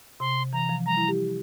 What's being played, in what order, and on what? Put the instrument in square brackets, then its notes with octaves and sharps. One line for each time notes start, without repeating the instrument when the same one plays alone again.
[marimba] C3 [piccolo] C6
[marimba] E3 [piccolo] A#5
[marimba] F3
[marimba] G3 [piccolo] A#5
[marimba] E4
G4